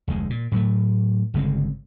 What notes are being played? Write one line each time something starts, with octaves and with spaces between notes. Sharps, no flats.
F1 D2 G#3
A#2
A2 F#3 A3
G1 C#3 G#3 C4